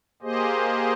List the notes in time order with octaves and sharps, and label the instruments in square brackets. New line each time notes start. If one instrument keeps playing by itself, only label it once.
[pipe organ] A#3 G4 G#4 C5 D#5